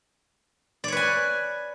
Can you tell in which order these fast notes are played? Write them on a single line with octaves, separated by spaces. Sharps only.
D5 C#5 B4 G#5